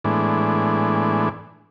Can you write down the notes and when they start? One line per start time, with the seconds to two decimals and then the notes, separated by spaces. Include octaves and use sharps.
0.05 A2 E3 G#3 B3 D4